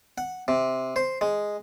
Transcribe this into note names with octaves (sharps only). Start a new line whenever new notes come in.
F#5
C3
C5
G#3